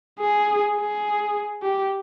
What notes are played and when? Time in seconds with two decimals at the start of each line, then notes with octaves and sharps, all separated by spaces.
0.20 G#4
0.77 G#4
1.62 G4